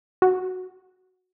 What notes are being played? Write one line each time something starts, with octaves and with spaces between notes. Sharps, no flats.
F#4